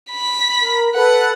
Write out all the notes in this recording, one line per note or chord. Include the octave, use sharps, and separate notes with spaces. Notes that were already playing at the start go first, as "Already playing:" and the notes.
B5 B6
A#4
A4 B4 F#5